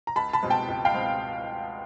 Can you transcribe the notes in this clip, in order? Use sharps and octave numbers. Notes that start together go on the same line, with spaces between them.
A#5
C#2 A5 B5
A5 B5
B2 G#3 C4
G5 A5
C#2
F5 G5
B2 G#3 C4